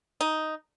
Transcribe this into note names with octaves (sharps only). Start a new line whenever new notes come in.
D#4